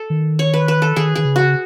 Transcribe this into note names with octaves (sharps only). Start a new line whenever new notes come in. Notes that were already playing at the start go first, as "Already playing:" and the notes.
Already playing: A4
D#3
C#5
B4
B4
A4
D#3 G#4
D#3 G#4
C#3
F#4